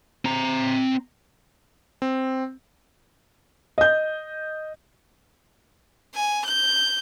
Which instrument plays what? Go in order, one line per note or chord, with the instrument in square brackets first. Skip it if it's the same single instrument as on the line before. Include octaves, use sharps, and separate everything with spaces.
[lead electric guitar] C4 A#5
[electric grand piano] C4
[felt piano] D#5 G6
[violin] G#5
G6